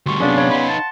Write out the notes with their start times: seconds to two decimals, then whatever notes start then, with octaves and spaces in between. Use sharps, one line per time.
0.06 D2 G3 F#4 C6 C#6
0.20 F#2 C3 B3 C#4 D4 G#4 D5 F5
0.37 C#5 F5 B5
0.51 D#4 B4 F#5 B5 C6
0.68 A5